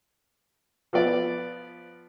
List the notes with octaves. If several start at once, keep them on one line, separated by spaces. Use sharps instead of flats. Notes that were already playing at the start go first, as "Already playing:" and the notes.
F3 B3 D5